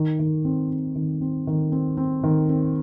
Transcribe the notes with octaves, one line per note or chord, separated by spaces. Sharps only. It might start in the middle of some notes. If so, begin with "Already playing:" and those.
Already playing: D#3
D#3
C4
C4
D#3
C4
D#3
C4
C4
D#3
C4